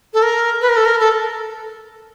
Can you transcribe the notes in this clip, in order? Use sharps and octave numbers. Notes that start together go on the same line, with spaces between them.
A4
A#4
B4
A#4
A4
A#4
A4